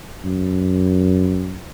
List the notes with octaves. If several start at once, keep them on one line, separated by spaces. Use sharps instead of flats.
F#2